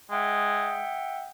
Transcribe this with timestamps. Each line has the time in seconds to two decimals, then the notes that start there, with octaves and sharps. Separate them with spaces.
0.10 G#3 E5 F#5 G5